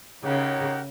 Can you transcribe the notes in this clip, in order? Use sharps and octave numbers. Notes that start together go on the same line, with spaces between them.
C#3 D#4 G4 A#4 C#5 F#5